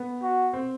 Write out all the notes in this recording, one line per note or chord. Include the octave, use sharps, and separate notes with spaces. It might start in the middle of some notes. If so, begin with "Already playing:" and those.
Already playing: B3
F#4
C4